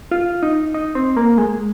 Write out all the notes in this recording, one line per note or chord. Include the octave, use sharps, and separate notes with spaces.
F4
D#4
D#4
C4
A#3
G#3